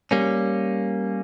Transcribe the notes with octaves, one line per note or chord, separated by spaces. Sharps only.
G3 A#3 C#4